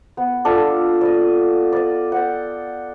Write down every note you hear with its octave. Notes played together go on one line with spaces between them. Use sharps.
B3
D4 F4 A4
D5 D#5
D5 D#5
F#5 G5